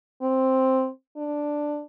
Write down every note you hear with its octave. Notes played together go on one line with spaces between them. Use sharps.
C4
D4